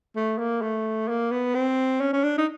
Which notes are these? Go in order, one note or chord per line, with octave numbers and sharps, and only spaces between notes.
A3
A#3
A3
A#3
B3
C4
C#4
C#4
D4
D#4